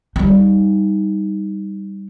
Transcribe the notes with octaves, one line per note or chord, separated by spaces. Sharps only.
G3 D#4